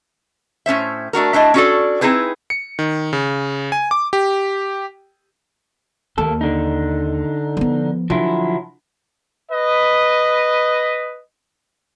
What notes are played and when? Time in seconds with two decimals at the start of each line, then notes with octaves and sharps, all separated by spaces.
0.66 A2 C#4 C5 E5
1.13 A3 D4 F#4 A#4
1.33 A3 D4 E4 D#5
1.54 C#4 D4 F#4 G#4 A4 D5
2.01 C4 D#4 E4 G#4 B4
2.50 C#7
2.79 D#3
3.13 C#3
3.72 G#5
3.91 D6
4.13 G4
6.18 D#2 A#3 A4
6.41 D3 D#4
7.57 F3 B3
8.10 D3 F3 F#3 E4
9.52 B4 D#5